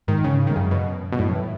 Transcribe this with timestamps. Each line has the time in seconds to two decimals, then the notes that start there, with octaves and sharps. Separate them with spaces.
0.08 G#2 D#3 G#3
0.24 C#3
0.47 D#3
0.51 G#3
0.56 F#2 C#3 F#3
0.71 B2
1.12 B2
1.18 F#2 A2 F#3
1.29 F#3
1.35 E3